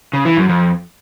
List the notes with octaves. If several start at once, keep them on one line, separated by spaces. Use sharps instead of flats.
C#3
E3
F#2
F2